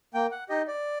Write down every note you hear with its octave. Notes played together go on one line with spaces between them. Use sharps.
A#3 G5
F#5
D#4 G4 D#5
D5